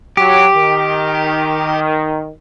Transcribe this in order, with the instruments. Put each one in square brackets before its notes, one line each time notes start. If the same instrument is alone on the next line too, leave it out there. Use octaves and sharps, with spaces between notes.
[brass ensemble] F#3 [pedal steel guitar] G4
[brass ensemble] D#3